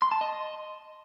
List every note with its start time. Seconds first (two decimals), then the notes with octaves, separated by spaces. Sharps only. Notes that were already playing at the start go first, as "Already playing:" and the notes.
0.02 C6
0.12 A5
0.21 D#5